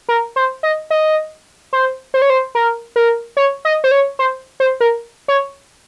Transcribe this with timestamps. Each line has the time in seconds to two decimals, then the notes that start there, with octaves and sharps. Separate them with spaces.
0.09 A#4
0.36 C5
0.63 D#5
0.90 D#5
1.73 C5
2.14 C5
2.22 C#5
2.30 C5
2.55 A#4
2.96 A#4
3.37 C#5
3.65 D#5
3.84 C5
3.91 C#5
4.19 C5
4.60 C5
4.80 A#4
5.28 C#5